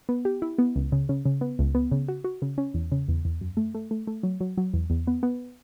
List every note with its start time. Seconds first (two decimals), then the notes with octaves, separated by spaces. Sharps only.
0.09 B3
0.25 G4
0.42 E4
0.58 B3
0.76 C#2
0.92 C#3
1.09 C#3
1.25 C#3
1.41 B3
1.59 C#2
1.75 B3
1.91 C#3
2.08 F#4
2.24 F#4
2.42 C#3
2.58 C#4
2.74 E2
2.92 C#3
3.08 E2
3.25 E2
3.41 F#2
3.57 A3
3.74 A3
3.91 A3
4.07 A3
4.23 F#3
4.40 F#3
4.57 F#3
4.74 E2
4.90 E2
5.07 B3
5.23 B3